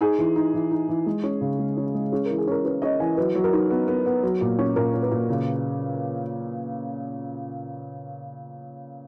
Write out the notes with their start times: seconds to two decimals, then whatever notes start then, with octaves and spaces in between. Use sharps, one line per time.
0.01 D#4 G#4
0.18 E3
0.36 D#4
0.54 E3
0.71 D#4
0.89 E3
1.06 G#3
1.24 C#4
1.41 C#3
1.59 G#3
1.77 C#4
1.94 G#3
2.12 C#4 G#4
2.26 E3 A#4
2.38 G#4
2.47 C#4 A#4
2.64 C#4 B4
2.82 C#4 D#5
3.00 E3 G#5
3.17 F#3 B4
3.35 F#3
3.44 A#4
3.53 D#4
3.70 B3
3.88 B3
4.06 B3
4.23 F#3
4.41 A#2
4.59 C#4
4.76 A#2 A#4
4.94 C#4
5.02 B4
5.11 A#2
5.29 C#3